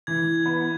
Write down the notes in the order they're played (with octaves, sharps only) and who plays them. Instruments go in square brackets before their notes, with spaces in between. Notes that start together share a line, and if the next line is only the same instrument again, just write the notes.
[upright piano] E3 [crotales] G#6
[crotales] G#6
[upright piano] B3